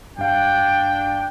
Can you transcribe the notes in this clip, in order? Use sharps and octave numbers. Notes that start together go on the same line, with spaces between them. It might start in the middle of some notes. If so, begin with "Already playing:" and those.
G2 D4 F5 G5